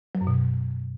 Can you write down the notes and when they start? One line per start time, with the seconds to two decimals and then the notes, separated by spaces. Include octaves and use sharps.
0.15 F#3
0.21 F#2
0.27 B2